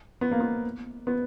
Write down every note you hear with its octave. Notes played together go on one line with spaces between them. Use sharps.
B3
A#3
B3
B3